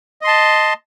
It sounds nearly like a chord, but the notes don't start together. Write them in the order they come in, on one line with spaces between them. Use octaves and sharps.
D#5 C6 A5